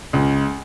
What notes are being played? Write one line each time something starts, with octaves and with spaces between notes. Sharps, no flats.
C#2